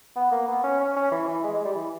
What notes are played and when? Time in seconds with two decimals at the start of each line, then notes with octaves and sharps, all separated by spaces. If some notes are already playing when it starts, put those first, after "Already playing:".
0.16 B3
0.32 A#3
0.48 B3
0.64 C#4
0.80 C#4
0.96 C#4
1.12 E3
1.28 E3
1.44 G#3
1.54 G#3
1.65 G3
1.75 E3